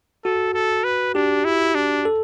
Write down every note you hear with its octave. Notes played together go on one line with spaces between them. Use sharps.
F#4 A4
A4
B4
D4 G4
E4
D4
A4